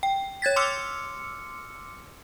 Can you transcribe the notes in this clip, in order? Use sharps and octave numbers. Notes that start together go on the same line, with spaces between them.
G5
C#5 G#6 A6 B6
C6 D6 E6 F6 C#7